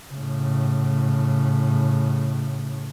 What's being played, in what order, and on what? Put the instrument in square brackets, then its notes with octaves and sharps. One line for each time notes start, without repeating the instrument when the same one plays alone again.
[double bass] A2 C#3